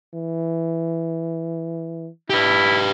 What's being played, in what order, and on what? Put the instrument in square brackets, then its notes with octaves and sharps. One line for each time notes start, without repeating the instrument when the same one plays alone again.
[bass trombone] E3
[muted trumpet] E4 [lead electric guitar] G4 B4